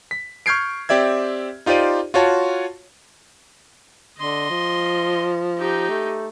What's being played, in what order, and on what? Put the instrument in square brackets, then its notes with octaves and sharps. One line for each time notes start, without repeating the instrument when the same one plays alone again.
[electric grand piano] B6
C#6 F6 G6 G#6 C7 D7
C4 G4 D5 E5 G#6
D#4 F4 G4 C5 D5 D#7
F4 F#4 C#5 A5
[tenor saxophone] D3 [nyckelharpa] D#5 C6
[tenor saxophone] F3
[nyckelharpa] D#4 G4
[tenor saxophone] A3